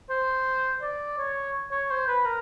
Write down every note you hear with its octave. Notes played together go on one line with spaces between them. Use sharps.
C5
D5
C#5
C#5
C5
B4
A#4